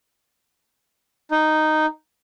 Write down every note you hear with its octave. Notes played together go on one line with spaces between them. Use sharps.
D#4